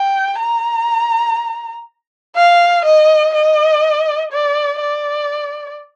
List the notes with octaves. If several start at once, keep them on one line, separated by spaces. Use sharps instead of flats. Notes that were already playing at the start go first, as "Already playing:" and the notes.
Already playing: G5
A#5
F5
D#5
D#5
D5
D5